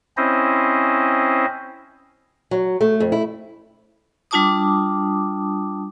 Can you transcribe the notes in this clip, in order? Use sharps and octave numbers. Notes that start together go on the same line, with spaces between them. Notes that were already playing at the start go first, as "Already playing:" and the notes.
C4 C#4 E4 C5 D#5
F#3
A3
F2
E4
G3 D4 F4 A5 D6 D#6